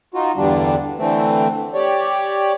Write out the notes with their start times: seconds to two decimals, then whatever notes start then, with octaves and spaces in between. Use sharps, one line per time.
0.14 D#4 F4 F#4
0.36 E2 G2 D3 G3 D4
0.98 D3 E3 A3 C4
1.74 G4 C#5 D5